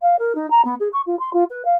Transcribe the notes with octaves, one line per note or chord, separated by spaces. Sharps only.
F5
A#4
D#4
A#5
B3
G#4
C#6
F4
C6
F4
B4
F5